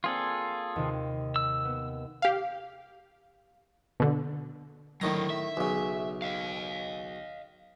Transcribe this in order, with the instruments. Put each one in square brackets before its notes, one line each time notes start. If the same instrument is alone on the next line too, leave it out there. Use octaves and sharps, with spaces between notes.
[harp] A#3 C4 D5 [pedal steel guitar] F4 G#4 A4
[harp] D#2 C3
[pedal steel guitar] E6
[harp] B3
[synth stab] G4 F5
B2 D3
[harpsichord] A2 D#3 A#5 [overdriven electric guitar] D3 F#3
[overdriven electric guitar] E5
[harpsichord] B1 C#3
[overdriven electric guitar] D#5 F5